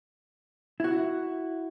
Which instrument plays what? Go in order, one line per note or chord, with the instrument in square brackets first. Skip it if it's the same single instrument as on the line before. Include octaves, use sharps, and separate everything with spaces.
[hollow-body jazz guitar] E4 F#4